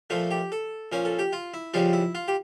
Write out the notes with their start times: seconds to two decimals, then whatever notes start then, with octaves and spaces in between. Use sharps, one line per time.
0.10 A#2 F3 A3 F4
0.31 G4
0.52 A4
0.92 A#2 F3 C#4 A#4
1.05 A4
1.19 G4
1.33 F4
1.54 E4
1.74 F2 C#3 G3 F4
1.93 E4
2.15 F4
2.28 G4